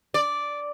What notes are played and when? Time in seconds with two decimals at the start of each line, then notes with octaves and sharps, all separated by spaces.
0.14 D5